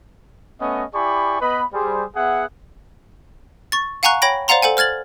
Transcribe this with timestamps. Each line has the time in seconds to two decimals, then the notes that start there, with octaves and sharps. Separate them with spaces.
0.61 A3 B3 C#4 D#5
0.94 E4 G4 D5 G#5 B5 C#6
1.41 B3 B4 D#5 B5
1.73 G3 G#4 C5
2.16 B3 G#4 E5 F#5
3.72 C#6 A6
4.03 F5 F#5 G#5 A#5 C#6 F#6
4.22 C#5 G5 B5 A#6 D7
4.48 C5 D5 F5 F#5 A#5 C6
4.62 A4 C5 F#5 G#5
4.77 C5 F6 G#6 A6 F#7